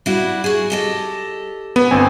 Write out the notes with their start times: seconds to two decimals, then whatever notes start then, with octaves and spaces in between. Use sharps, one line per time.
0.06 G3 E4 F#4
0.44 F#4 G#4
0.70 G4 A4 D#5
1.76 A#2 B3
1.91 G1 C4 G#5